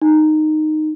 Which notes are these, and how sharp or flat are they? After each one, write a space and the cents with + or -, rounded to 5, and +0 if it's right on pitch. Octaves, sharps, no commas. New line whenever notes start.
D#4 -10